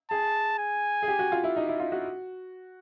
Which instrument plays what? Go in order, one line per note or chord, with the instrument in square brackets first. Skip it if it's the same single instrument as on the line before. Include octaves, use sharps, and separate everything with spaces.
[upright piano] G#4 [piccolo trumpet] A5
[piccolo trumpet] G#5
[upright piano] G#4
G4
F#4
F4
E4
D#4
E4
F4
F#4